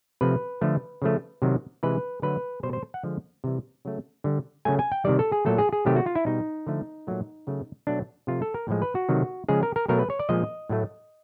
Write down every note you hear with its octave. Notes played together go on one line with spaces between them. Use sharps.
C3 F3 A3 B4
D3 F3 A3
C#3 F3 A3
C3 D#3 F#3
C3 E3 G#3 B4
D3 F#3 A3 B4
B2 G3 C5
C5
F#5
D3 F3 G#3
C3 E3 G3
C#3 F#3 A3
D3 G3
C#3 F#3 A3 G#5
G#5
G5
C3 D#3 G3 D5
A4
G#4
A#2 F#3 A3 A4
G#4
G#4
C3 D#3 F#3 A3 G4
F#4
F4
E4
B2 G3 D#4
D3 F3 A3
A#2 F#3 A3
C#3 F#3 A3
B2 F#3 A3 D4
C3 F3 A3 F4
A4
A#4
A2 F3 G#3
B4
F#4
C3 D#3 F#3 A3
C#3 F3 G#3 G#4
A#4
A#4
B2 F#3 A3 A#4
B4
C#5
D5
A#2 F3 G#3 D#5
A2 F#3 A3